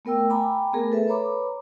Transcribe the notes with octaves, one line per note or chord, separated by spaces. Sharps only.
A3 B3 A#4 G5 E6
G5 G#5 A#5 B5 D6
A3 B3 G#4 A#4
A4 B4 E5
B4 C#5 A#5 B5 D6